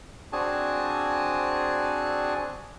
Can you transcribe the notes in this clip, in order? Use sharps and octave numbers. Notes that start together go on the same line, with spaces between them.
C4 D4 F#4 G#4 G#5 A5